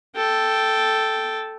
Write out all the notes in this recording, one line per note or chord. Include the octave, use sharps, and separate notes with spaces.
A4 G5